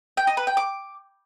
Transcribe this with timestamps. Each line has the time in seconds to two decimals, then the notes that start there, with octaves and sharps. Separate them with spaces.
0.17 G5
0.27 D#5
0.37 B4
0.47 G5
0.57 D6